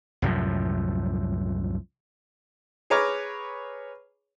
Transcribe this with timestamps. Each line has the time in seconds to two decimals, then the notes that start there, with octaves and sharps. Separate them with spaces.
0.22 C2 F#2 A2 F3
2.90 G#4 B4 C#5 A#5 D6 F6